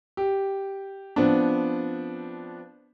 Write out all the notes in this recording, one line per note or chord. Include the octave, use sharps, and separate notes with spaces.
G4
F3 B3 C4 D4